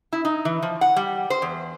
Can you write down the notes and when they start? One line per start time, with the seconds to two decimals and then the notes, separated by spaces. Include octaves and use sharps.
0.13 E4
0.25 D#4
0.45 E3
0.62 F3
0.81 F#5
0.96 G3
1.30 C5
1.42 E2